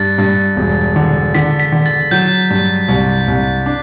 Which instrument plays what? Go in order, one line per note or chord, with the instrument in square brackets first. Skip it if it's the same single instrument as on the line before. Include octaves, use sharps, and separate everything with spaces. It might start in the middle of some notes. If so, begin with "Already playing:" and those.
Already playing: [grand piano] G2 [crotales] A6
[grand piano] G2
E1
D3
[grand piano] D3 [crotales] B6
[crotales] B6
[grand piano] D3
[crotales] A6
[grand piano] F#3 [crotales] G6
[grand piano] G2
C2
C2
D4